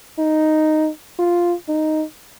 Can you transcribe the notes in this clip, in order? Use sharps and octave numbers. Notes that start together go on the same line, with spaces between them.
D#4
F4
D#4